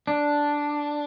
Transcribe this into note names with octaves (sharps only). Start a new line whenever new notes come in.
D4